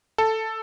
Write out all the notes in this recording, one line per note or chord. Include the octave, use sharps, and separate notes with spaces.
A4